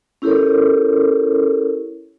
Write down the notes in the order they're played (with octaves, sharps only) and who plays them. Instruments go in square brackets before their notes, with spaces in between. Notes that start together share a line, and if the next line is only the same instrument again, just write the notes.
[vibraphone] C#4 E4 G4 A4 A#4 C#5